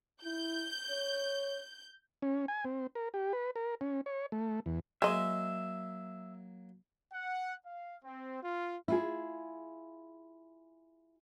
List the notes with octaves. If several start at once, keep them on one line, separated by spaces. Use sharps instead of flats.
E4 G6
C#5
C#4
G#5
C4
A#4
G4
B4
A#4
C#4
C#5
A3
E2
F#3 G#3 A#3 D#5 E5
F#5
F5
C4
F4
E4 F4 G#4